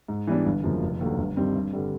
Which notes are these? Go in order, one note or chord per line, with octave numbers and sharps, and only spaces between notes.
G#2
E3 G3 B3 D4
G1
F#2 C#3 F3 A#3
F1
D#2 D3 F#3
G1
G2 D#3 G3 C4
G2
D3 G3